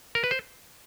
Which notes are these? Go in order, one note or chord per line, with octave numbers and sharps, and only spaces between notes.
A#4
B4
C5